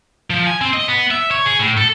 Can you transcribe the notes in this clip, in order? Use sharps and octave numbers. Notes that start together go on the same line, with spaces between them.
F3
G#5
C4
D#5
B3
E5
C#5
G#4
A2
A4